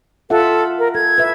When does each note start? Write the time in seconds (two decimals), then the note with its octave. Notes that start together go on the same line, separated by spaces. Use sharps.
0.30 F4 A4 E5 F#5
0.79 A#4
0.95 A4 G#6
1.18 B4 E5